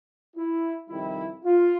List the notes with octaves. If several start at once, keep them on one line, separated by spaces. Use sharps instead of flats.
E4
F2 C3 D#3 G3 E4
F4